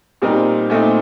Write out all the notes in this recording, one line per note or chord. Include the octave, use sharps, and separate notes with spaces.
A#2 G3 C4 D#4 A#4
A#2 A3 C4 D#4